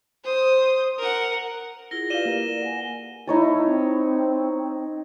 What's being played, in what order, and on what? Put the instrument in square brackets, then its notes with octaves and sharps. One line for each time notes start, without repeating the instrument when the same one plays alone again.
[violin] C5 D#6
A#4 F#5
[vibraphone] E4 F4 G#4 [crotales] A#6 G7
[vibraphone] E4 G4 B4 [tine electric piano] D5 F5 [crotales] D#7 E7 G7
[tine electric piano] A#3 A#4
[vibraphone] D5
F#5 G#5
[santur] D#4 C#5 A5 [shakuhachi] E4
[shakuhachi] C4